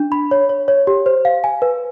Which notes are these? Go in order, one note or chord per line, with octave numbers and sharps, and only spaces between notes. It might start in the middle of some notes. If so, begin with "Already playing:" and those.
Already playing: D4
B5
C#5
C#5
C#5
G4
C5
F5
G#5
B4